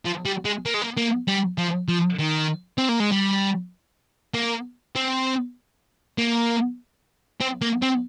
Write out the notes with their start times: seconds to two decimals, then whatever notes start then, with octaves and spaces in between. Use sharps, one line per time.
0.05 F3
0.25 G3
0.45 G#3
0.66 A#3
0.74 G#3
0.82 A#3
0.97 A#3
1.28 G3
1.58 F3
1.88 F3
2.19 D#3
2.78 C4
2.89 A#3
3.00 G#3
3.12 G3
4.34 A#3
4.96 C4
6.18 A#3
7.41 C4
7.62 A#3
7.82 C4